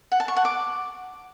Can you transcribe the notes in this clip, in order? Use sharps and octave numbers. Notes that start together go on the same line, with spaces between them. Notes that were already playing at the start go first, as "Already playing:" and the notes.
F#5
A5
C#6
F#5
D6